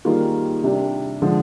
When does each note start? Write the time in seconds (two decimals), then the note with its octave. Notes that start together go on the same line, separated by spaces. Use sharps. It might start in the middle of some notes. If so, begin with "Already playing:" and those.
0.05 D#3 G3 A#3 F4 G#4
0.63 C3 G3 D4 G4
1.22 D3 F3 G#3